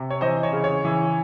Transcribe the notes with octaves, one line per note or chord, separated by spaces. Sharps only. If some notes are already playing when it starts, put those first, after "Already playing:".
Already playing: C3
C#5
E3 C5 D#5
C#5
C#3
C#5
E3